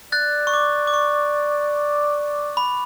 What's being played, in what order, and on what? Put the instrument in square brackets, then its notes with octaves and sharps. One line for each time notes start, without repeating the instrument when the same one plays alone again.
[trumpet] D5 [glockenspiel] F#6 A6
[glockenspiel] C#6
D6
D6
C#6
B5